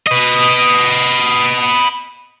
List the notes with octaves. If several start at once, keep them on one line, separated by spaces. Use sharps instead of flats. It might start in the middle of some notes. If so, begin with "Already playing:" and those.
B4 D#5